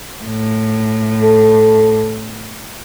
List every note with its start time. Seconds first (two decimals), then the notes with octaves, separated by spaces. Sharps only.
0.24 A2
1.22 A4